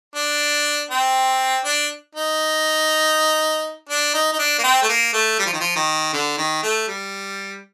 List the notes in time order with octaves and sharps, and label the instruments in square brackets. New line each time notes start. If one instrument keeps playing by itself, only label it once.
[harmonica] D4
C4
D4
D#4
D4
D#4
D#4
D4
A#3
C4
A3
A#3
A3
G3
F3
D#3
F3
D#3
D3
D#3
A3
G3